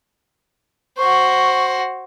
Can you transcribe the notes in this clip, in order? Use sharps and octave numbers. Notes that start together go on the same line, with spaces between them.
F#4 C5 C#6